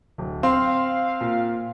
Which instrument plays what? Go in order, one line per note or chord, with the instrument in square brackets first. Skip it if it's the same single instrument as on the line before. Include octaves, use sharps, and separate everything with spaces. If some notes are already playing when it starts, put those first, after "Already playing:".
[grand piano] D1
[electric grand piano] C4 [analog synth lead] F5 [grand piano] C6
[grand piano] A#2